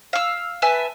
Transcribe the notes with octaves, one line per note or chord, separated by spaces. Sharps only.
F5 E6
B4 E5 G#5 A5